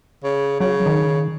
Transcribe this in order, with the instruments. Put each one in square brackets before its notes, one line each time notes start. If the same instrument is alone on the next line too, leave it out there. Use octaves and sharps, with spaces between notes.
[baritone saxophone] C#3
[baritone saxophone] C#3 [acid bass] F#3
[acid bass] D#3